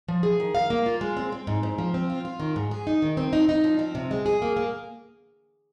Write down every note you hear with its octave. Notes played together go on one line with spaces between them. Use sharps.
F3
G#4
D#3
F5
A#3
F4
G#3
C4
C4
G#2
G#2
F3
C4
F4
F4
D#3
G#2
G#4
D#4
D#3
C4
D#4
D#4
F3
C4
C3
G#3
G#4
A#3
A#3